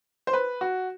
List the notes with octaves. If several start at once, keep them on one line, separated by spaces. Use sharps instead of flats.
C5
B4
F#4